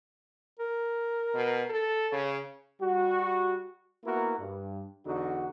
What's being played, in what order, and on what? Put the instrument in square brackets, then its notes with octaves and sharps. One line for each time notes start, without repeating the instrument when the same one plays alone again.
[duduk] A#4
[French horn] B2
A4
[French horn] C#3 [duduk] C#5
[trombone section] G3 F#4
A#3 B3 E4 F#4 A#4
G2
E2 D3 D#4 F#4